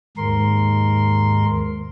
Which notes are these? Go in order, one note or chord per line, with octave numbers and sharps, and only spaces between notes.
D#2 G#2 A#4 C6